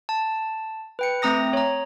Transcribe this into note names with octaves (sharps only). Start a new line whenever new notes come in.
A5
B4 G5 C#7
A3 C4 A#5 D#6 A#6
C#5 A#5